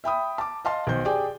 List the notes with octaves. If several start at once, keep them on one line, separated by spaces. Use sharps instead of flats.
E5 G5 B5 D#6
A5 D6
D#5 F5 A5 C6
B1 D#3 C5 G6
G4 G#4 D5 G5 G#5